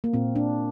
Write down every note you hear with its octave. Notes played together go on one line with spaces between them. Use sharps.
A#3
A#2 C4
D4